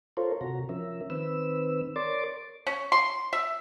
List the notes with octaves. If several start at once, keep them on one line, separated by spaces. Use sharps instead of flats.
F4 A4 A#4 C5 C#5
C3 F#4 A#5
F3 C#4 A#4 E5
D#3 C4 B4 E6
A#4 C#5 D5 C6 D6 A6
C#4
C6
E5